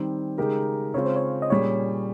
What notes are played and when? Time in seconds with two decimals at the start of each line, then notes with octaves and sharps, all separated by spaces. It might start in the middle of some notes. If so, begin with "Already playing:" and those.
Already playing: D#3 G3 C4
0.38 C#3 G#3 D#4 G4 A#4
0.94 C#3 G#3 C4 F4 C#5
1.05 C5
1.16 C#5
1.42 D#5
1.50 A#2 G3 C#4 G#4 C#5